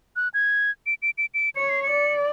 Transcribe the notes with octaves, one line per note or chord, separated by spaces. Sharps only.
F#6
G#6
D7
D7
D7
D7
C#5 C#7
C7
C#7
D5